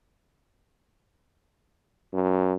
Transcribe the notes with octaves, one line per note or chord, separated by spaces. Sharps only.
F#2